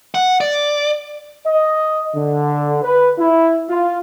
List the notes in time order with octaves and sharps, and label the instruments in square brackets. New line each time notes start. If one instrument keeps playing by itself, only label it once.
[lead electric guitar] F#5
D5
[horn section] D#5
D3
B4
E4
F4